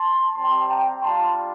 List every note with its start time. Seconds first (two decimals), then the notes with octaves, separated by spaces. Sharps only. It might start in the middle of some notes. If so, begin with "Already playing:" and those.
Already playing: A5 C6
0.34 G3 C4 G4 A5 C6
0.68 G5 A#5
1.02 G3 D4 F4 A5 C6